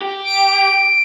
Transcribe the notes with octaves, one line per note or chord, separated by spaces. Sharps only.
G4
D7